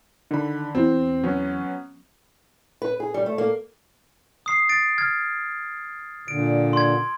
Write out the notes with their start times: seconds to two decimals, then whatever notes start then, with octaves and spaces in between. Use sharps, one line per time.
0.31 D3 D#3 B5
0.75 E2 B2 C4
1.23 F#3 B3 C#4
2.82 B4
3.00 G#4
3.14 G3
3.26 A3
3.38 A#3
4.46 D#6 C7
4.69 A6 D7
4.98 F6 G#6
6.28 A#2 D3 D7
6.73 C6 G#6